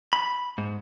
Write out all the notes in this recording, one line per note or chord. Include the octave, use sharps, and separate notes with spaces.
B5
G#2